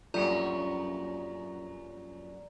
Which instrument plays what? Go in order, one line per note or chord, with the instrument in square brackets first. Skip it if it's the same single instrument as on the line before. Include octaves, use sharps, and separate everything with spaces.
[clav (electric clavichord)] A#1 G3 A3 [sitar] F#2 C#4 [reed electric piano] F4 [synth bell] D5 A#5